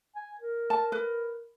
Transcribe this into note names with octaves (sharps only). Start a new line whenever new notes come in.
G#5
A#4
A5
B4